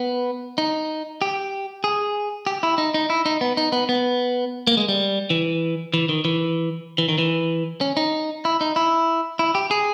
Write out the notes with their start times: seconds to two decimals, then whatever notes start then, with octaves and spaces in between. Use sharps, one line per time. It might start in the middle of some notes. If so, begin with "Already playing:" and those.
Already playing: B3
0.58 D#4
1.22 G4
1.84 G#4
2.47 G4
2.63 E4
2.78 D#4
2.94 D#4
3.10 E4
3.26 D#4
3.41 B3
3.57 D#4
3.72 B3
3.89 B3
4.67 A#3
4.77 G#3
4.89 G3
5.30 E3
5.94 E3
6.09 D#3
6.25 E3
6.98 E3
7.09 D#3
7.18 E3
7.81 C#4
7.97 D#4
8.45 E4
8.61 D#4
8.76 E4
9.39 E4
9.55 G4
9.71 G#4